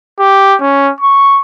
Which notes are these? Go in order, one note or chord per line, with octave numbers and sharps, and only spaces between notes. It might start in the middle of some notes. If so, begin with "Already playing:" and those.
G4
C#4
C#6